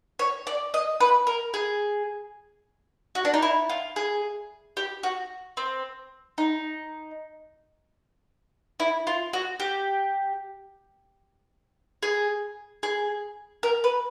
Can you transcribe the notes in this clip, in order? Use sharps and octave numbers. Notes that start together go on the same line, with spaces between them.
C#5
D5
D#5
B4
A#4
G#4
F#4
D4
D#4
E4
F4
G#4
G4
F#4
C4
D#4
E4
F4
F#4
G4
G#4
G#4
A#4
B4